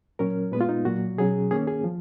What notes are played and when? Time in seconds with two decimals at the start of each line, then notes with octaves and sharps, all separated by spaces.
0.19 A#2 F#3 C#4 A#4
0.52 A#2 G#3 B3 B4
0.61 F4
0.69 D#4
0.85 A#2 F#3 A#3 F#4
1.18 B2 F#3 C#4 G#4
1.51 D#3 A#3 C#4 G#4
1.67 G#4
1.84 F3